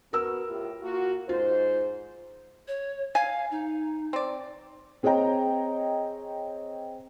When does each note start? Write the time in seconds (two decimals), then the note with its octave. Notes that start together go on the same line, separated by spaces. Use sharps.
0.13 B3 F#4 A#4 E6
0.48 A2 F4 G4
0.83 A#3 F4 F#4
1.29 G#2 F4 C5
2.68 C#5
3.15 F5 G#5
3.51 D#4
4.13 C4 D5
5.03 C4 G#4 C#5 D#5 G5 A#5